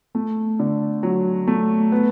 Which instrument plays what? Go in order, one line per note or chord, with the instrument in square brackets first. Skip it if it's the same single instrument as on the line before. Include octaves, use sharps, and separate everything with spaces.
[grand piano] A3
D3
F#3
A3
B3